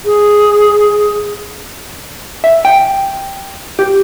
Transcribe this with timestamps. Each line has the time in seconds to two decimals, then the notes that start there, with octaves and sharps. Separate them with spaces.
0.05 G#4
2.44 E5
2.65 G5
3.79 G4